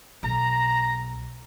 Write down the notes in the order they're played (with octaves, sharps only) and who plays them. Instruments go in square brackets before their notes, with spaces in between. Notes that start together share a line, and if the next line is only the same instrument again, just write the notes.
[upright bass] B1 [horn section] A#5